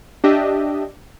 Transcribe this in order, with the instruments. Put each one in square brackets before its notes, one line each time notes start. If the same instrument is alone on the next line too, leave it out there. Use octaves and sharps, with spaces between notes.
[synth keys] D4 G4 D#5 E5